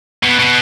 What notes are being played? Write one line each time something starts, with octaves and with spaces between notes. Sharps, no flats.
B2
B2